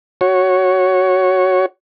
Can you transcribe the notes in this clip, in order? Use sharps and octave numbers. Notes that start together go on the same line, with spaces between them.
F#4 C#5